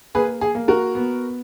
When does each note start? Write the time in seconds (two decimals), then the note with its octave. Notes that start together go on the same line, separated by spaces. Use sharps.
0.15 A#3 G#4 B4
0.41 G#4
0.55 A#3
0.68 F#4 A#4
0.95 B3